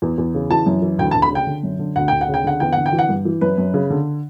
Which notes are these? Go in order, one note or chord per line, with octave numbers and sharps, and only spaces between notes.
E2
E2
C#3
E3 A5
F#2
E3
D2 G5
A5
D2
B5
C#3 G5
D3
F#2
D3
D2 F#5
D2 G5
F#5
C#3
G5
D3 F#5
E2 G5
D3 F#5
G5
E3
F#5
G2
E3
F#2 B4
F#2
C#3
D3